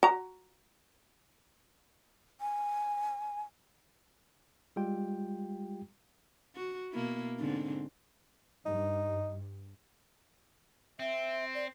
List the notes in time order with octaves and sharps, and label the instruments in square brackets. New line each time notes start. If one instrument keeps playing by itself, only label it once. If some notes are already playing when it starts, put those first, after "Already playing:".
[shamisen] F#4 A#5
[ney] G#5
[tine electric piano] G3 G#3 F4 G4 G5
[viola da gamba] F#4
B2 A#3 E4
G#2 D3 C4
[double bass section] G2 [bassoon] D#4
[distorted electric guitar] C4 [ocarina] E5
[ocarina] D5